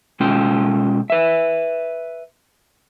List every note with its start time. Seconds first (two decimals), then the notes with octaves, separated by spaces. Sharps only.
0.20 B2 G#3 C#4 F4 G5
1.10 B4 E5